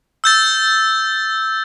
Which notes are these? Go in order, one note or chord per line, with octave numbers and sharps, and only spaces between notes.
E6 G6 A6